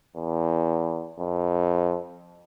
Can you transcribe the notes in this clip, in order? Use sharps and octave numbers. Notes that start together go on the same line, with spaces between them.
E2
F2